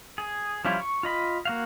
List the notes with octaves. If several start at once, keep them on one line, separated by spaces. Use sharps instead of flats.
G#4
F3 G3 C#4 E4 F4
C#6
F4 D#5 B5
A#3 F#4 F5